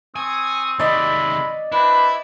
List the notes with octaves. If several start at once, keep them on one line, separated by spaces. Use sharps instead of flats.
C4 G#5 C#6 D#6
C3 D#3 G#3 D5 D#5 B5
C4 D4 E4 B4